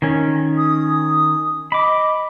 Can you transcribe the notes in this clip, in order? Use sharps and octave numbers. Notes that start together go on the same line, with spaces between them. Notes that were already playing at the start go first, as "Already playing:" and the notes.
D#3 C#4
D#6
D#5 B5 D6